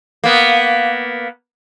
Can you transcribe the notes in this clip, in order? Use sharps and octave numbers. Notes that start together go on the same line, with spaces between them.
A#3 B3